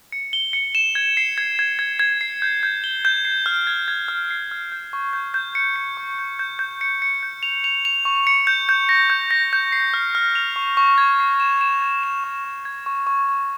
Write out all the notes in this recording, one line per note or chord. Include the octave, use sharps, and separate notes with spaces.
C#7
G7
C#7
E7
G#6
C7
G#6
G#6
G#6
G#6
C7
G6
G6
G7
G6
C7
F6
G#6
G#6
F6
C7
F6
G6
C#6
G6
G6
C#7
C#7
C#6
G6
G6
G6
C#7
C#7
G6
F7
F7
F7
C#6
C#7
G6
G6
A#6
G6
A#6
G6
C7
F6
F6
F7
C#6
C#6
G#6
C7
E7
E7
G#6
E7
C#6
C#6
G#6
C#6
C#6
C#6